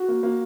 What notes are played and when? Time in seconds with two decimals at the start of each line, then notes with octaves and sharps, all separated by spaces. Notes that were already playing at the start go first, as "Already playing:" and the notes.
Already playing: F#4
0.08 A#3
0.23 A#3